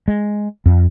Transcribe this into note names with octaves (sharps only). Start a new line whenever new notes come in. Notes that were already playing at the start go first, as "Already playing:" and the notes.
G#3
F2